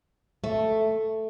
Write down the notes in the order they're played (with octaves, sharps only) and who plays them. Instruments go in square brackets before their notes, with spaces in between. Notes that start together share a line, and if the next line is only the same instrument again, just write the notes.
[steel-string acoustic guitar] A3